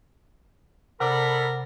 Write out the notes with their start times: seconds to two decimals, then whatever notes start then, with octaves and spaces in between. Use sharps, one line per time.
1.00 C3 D4 A4 A#4 F#5 A#5 B5 D6